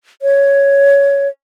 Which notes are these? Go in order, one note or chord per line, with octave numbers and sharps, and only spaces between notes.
C#5